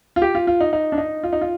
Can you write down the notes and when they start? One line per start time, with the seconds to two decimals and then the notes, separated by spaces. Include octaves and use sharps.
0.16 F4
0.22 G4
0.35 F4
0.47 F4
0.61 D#4
0.73 D#4
0.92 D4
0.98 D#4
1.23 F4
1.33 D#4
1.41 F4